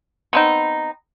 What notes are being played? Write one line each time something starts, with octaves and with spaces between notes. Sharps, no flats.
B3 C4 D#4